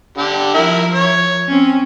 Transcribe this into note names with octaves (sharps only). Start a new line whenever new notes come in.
D3 G4
F3 E4 A#4
C#5
C4 C#4